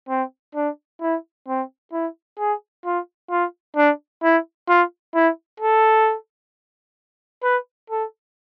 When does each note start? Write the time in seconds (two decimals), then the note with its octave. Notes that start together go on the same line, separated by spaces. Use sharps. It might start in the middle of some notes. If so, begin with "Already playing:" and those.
0.09 C4
0.55 D4
1.02 E4
1.48 C4
1.93 E4
2.39 G#4
2.85 F4
3.31 F4
3.76 D4
4.23 E4
4.69 F4
5.15 E4
5.60 A4
7.43 B4
7.90 A4